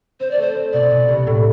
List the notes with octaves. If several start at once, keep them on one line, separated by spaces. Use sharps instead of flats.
C4 C5
D5
A3 C5
C4
B2 D5
B2
C2
A2